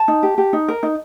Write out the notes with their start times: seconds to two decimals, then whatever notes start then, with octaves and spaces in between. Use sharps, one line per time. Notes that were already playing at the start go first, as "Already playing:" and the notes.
Already playing: A5
0.08 D#4
0.23 G4
0.38 G4
0.53 D#4
0.69 A#4
0.83 D#4